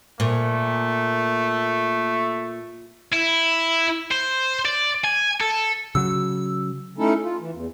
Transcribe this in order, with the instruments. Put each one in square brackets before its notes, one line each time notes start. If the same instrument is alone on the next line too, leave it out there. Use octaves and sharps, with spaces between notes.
[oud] A#2 [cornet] A3
[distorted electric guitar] E4
C5
D5
G#5
A4
[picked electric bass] C#3 F#3 [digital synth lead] E6
[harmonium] A3 C#4 D#4 E4 A4
F4
E3
E2